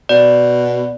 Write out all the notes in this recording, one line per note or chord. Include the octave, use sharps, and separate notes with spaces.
B2 D5